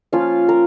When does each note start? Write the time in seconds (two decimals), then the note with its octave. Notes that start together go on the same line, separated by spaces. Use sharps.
0.12 F3 A#3 C#4 F4 F5
0.49 A#4